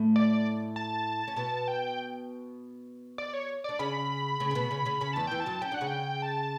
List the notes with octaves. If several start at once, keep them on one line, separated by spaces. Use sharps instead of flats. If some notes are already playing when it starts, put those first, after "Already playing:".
Already playing: A2 A3
D5
A5
C#4
B2 B3 A5
G5
D5
C#5
D4 D5
C#3 C#4 B5
C#3 C#4
C#4
B2 B3
C#3 C#4
C#3 C#4
C#3 C#4 B5
E2 E3 A5
E2 E3 G5
A5
F#2 F#3
C#4 G5
D4 F#5
C#3 C#4
G5
A5